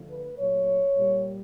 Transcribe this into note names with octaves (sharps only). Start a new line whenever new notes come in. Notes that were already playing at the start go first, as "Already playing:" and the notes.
Already playing: D3 F3 A3
B4
A#2 F#3 A3 C#5
A#2 G3